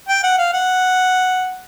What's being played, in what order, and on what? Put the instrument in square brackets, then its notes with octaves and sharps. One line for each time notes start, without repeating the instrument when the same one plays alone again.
[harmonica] G5
F#5
F5
F#5